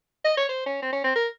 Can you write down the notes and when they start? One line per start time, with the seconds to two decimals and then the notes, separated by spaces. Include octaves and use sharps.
0.24 D#5
0.37 C#5
0.49 C5
0.66 C#4
0.83 C4
0.92 C#4
1.04 C4
1.15 A#4